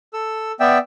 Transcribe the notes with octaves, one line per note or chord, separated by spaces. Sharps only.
A4 E6
B3 D5 E5 G5 E6